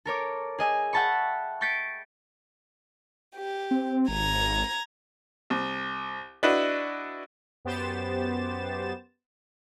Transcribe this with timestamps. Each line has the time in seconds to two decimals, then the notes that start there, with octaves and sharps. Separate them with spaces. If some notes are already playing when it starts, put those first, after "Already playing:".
0.05 A4 A#4 C#5 D6
0.58 G#4 D#5 G#5 E6
0.93 E5 F#5 G5 A5 B5 C#6
1.61 C#6 G6 A6 B6 C#7 D7
3.35 G4
3.71 C4
4.09 G#1 A#5 G#6
5.50 C2
6.43 D4 E4 F#4 B4 D#5
7.65 F#2 B3 G4 C5 A6 E7